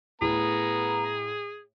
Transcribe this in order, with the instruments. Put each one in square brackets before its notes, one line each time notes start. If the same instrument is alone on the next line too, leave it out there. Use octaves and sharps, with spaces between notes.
[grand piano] A2 [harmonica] B3 A#5 [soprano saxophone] G#4